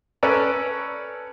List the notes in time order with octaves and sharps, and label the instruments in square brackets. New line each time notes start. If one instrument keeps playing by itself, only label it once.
[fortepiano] C#4 A4 B4 D5 A#5